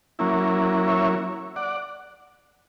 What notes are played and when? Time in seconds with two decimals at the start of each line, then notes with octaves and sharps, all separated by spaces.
0.19 F#3 A#3 C#4 E4
0.88 C#5 E5
1.56 D5 F#5